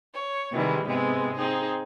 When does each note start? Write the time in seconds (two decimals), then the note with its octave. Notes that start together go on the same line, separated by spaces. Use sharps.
0.13 C#5
0.52 C3 D#3 E3 G3 G#3
0.85 G#2 C3 G#3 B3 C4
1.36 C4 D#4 G#4